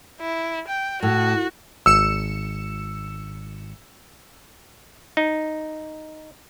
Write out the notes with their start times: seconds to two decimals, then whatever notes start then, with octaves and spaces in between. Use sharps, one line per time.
0.20 E4
0.68 G5
1.03 A2 F#4
1.86 G#1 E6 C#7 E7
5.17 D#4